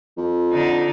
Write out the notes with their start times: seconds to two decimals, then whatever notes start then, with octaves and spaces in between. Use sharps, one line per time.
0.17 F2
0.52 D3 D4 D#4